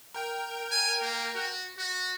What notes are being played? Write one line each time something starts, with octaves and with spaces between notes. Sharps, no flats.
A#4 G5
G#5
A#3
F#4
F#4